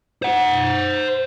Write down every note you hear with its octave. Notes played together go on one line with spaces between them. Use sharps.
C5 F#5